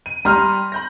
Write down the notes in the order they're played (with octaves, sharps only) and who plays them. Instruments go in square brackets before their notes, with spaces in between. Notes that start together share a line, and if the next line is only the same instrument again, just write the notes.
[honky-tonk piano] D#7
[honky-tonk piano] G3 [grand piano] A#5 C6 F6
[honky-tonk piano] B5 G6 A#6